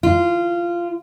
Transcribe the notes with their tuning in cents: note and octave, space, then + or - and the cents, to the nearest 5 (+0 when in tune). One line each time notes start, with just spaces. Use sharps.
F4 -15